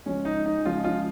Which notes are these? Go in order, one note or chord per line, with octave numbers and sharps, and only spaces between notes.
C#3 F3 G#3 C#4
D#4
D#4
C#3 F3 G#3 F4
F4